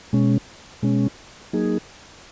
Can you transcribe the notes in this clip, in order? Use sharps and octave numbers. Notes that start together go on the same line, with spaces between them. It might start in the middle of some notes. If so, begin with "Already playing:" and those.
B2 G#3 C#4
B2 G#3 C#4
F#3 A#3 D#4 G#4